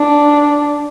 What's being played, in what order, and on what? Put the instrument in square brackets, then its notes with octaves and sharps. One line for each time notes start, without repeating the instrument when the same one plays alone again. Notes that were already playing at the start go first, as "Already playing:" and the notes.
Already playing: [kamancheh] D4